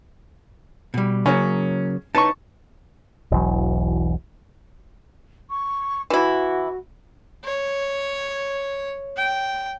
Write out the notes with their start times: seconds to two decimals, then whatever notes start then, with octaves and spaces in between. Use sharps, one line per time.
0.94 B2 G3
1.26 C#3 F#3 A#3 C#4
2.15 D#4 B4 C#5 A5 C#6
3.32 E1 B1 E3 F#3
5.49 C#6
6.10 E3 E4 F#4
7.45 C#5
9.17 G5